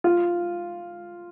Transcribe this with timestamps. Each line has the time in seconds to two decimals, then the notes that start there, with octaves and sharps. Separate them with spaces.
0.04 F4